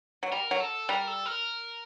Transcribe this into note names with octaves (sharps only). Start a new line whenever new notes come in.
F#3
G3 A#4
F#3
A4
G3 A#4
A4
A#4